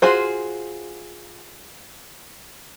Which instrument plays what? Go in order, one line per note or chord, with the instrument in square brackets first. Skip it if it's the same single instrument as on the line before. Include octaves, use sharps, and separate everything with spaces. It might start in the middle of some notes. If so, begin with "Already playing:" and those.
[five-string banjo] F4 F#4 G#4 C5